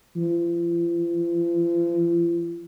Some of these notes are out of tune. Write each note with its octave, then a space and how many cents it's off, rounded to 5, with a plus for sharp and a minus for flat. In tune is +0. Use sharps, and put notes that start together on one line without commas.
F3 -40